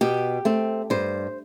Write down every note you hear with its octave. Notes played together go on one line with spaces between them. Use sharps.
B2 G4
A3 C4
G2 C5